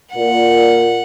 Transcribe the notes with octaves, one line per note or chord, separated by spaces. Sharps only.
A#2 F#5